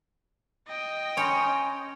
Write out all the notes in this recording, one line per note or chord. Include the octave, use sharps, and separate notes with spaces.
D#5 G5
C#4 C#5 G#5 B5 C6